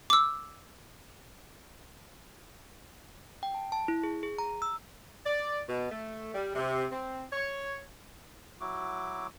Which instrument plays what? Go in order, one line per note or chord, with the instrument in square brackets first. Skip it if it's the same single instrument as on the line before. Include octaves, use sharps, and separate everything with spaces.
[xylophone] D6 E6
[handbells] G5
A5
A5
E4
G#4
G#4
A#5
E6
[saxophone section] D5
B2
A3
G3
C3
C4
C#5
[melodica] F#3 E4 F#4 D6